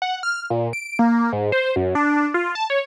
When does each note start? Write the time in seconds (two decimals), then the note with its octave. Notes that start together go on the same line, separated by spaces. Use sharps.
0.02 F#5
0.23 F6
0.50 A#2
0.73 D7
0.99 A#3
1.32 G#2
1.52 C5
1.76 F#2
1.95 D4
2.34 F4
2.55 A5
2.70 C#5